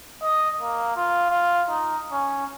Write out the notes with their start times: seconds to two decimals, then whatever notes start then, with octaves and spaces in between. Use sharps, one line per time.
0.22 D#5
0.61 A#3
0.96 F4
1.30 F4
1.69 D#4
2.12 C#4